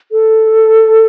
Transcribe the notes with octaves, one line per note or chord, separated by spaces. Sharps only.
A4